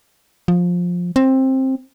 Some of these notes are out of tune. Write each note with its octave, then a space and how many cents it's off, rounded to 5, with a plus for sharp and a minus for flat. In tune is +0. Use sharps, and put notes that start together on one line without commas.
F3 +15
C4 +15